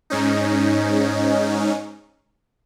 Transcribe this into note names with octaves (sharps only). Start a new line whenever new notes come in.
G#2 C#4 D#4